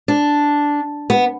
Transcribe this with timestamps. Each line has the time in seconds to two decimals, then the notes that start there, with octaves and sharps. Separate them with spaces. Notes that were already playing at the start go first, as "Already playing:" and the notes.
0.08 D4
1.10 B3